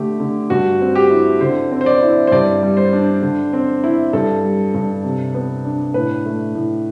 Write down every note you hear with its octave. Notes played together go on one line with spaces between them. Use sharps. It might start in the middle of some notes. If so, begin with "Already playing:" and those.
Already playing: D3 A3 G4
D3
G2 F#4
C4
G4
E4
D3 C5
C4
C5
D5
E4
C5
G2 D5
G3
C5
D4
D3
C4
E4
G2 A4
G3
G2
C3
B3
D4
A2 B4
A3
A2